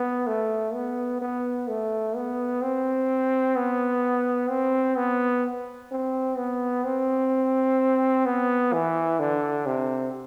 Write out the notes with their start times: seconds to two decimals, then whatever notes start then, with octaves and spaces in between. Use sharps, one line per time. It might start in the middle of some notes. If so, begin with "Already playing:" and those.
Already playing: B3
0.27 A3
0.74 B3
1.22 B3
1.68 A3
2.15 B3
2.62 C4
3.56 B3
4.49 C4
4.97 B3
5.91 C4
6.37 B3
6.85 C4
8.26 B3
8.73 E3
9.19 D3
9.66 C3